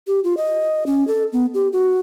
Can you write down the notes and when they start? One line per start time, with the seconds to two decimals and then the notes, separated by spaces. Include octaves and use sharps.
0.07 G4
0.24 F4
0.37 D#5
0.86 C#4
1.08 A4
1.33 B3
1.54 G4
1.73 F#4